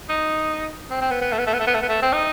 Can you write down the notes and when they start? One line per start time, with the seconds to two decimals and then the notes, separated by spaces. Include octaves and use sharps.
0.09 D#4
0.91 C4
1.01 C4
1.11 B3
1.21 B3
1.32 A3
1.38 B3
1.46 A3
1.53 B3
1.59 A3
1.67 B3
1.74 A3
1.82 B3
1.89 A3
2.02 C4
2.13 D#4